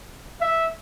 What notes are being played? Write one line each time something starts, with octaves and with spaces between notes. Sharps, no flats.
E5